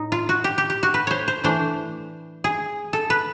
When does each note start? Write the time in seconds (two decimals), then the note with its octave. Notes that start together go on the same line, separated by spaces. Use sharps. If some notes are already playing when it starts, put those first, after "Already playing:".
Already playing: A2 D#4
0.12 F4
0.29 F#4
0.44 G4
0.58 G4
0.70 G4
0.83 F#4
0.94 B4
1.07 C5 C#5
1.28 C5
1.44 E3 A3 D4 C5
2.44 G#4
2.93 A4
3.10 B4